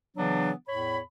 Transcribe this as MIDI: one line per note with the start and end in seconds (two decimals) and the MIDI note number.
0.16 0.51 49
0.16 0.51 52
0.16 0.51 54
0.16 0.51 59
0.16 0.51 62
0.68 0.98 40
0.68 0.98 45
0.68 0.98 73
0.68 0.98 83